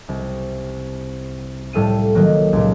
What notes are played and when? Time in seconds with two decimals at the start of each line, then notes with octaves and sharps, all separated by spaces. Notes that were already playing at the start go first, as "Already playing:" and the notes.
0.09 C2
1.73 A2 G3 A4 F5 D#7
2.15 D#3 F#3 A#3
2.53 C#2 A#2